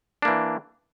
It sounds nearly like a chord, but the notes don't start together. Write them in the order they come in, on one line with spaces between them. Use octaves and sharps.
D4 A#3 E3